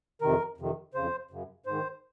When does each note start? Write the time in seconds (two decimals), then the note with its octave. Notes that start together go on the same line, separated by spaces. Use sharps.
0.21 F2 C3 D#3 A#4
0.58 F2 C3 D#3
0.94 F2 C#3 C5
1.31 F#2 C#3
1.66 G#2 D#3 C5